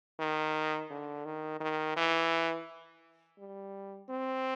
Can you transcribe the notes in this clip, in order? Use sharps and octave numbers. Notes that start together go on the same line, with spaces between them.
D#3
D3
D#3
D#3
E3
G3
C4